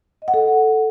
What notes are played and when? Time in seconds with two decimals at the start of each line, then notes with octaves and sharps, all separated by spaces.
0.22 D#5
0.28 F#5
0.34 A4